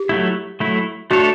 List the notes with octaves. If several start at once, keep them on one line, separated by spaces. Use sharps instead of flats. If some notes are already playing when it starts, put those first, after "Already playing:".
Already playing: G4
F#3 A3 E4
F#3 A3 E4
A3 D4 F#4 A4 C#5